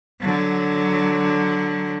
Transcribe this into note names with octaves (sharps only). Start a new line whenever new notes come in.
D3 F#3